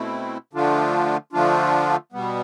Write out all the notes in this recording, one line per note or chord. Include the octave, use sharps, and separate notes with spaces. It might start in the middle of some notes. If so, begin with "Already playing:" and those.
Already playing: B2 A3 C4 E4
D3 F3 A3 D4 F4
D3 F3 A3 D4 F4
B2 G3 B3